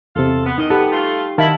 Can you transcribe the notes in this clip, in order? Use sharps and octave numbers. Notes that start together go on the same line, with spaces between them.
E2 C3 F4 A4
B3
E2 D#3 D#4 D#5
B3 G4 A4
A3 F4
D#3 F#3 C4 E4 F5 A5